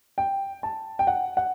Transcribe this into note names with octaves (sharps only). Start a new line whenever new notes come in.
G5
A5
G5
F#5
F#5